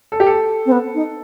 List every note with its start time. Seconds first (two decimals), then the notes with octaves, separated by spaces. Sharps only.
0.12 A4
0.20 G4
0.26 A4
0.66 C4
0.71 B3
0.94 D#4